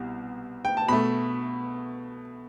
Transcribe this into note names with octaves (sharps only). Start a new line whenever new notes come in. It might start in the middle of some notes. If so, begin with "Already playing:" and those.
Already playing: C2 B2
G5
A5
B2 A3 B5